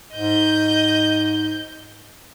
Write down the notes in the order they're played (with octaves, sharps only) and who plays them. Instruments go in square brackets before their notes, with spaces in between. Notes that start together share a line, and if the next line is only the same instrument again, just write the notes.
[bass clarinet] G#2 [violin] D#5 G6